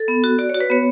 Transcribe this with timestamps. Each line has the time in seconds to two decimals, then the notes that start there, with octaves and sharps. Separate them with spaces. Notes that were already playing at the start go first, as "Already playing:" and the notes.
Already playing: A4
0.08 B3
0.24 F#4
0.39 F#4 D5
0.49 C#5
0.55 F#4
0.60 B4
0.70 B3 C#5